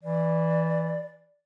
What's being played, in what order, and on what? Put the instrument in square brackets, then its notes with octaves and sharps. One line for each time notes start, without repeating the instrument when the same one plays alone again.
[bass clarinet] E3 [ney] D5